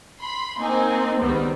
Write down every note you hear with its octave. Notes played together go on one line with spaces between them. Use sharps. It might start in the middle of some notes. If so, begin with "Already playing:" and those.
B5 C6
A#3 C4 D#4 G#5
C#2 D#3 G3 B3 C4